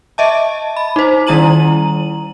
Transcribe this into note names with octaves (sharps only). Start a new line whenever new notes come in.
D#5 E5 A5
B5
D#4 C5
D#3 G3 E4 A#5 D#7 F#7